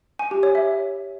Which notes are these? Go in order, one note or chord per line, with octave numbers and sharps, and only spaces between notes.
G#5
G4
C#5
E5